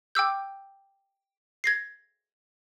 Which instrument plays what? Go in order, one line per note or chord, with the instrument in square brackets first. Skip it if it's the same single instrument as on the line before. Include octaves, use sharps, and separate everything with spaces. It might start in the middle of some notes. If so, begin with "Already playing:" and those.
[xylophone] G5 D6 E6 G6
G#6 A#6 C7